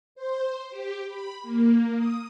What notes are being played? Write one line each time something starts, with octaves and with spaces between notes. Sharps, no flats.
C5
G4
B5
A#3
D#6